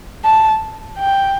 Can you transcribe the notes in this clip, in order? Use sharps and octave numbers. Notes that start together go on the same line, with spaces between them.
A5
G5